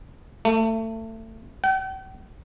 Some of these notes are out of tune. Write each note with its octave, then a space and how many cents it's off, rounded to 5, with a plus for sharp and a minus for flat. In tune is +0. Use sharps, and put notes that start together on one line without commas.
A3 +25
G5 -45